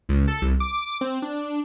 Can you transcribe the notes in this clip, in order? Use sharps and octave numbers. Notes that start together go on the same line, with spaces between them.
C#2
A4
C2
D6
C4
D4